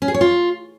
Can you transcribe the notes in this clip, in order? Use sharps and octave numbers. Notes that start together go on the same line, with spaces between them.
C#4
G#4
C#5
F4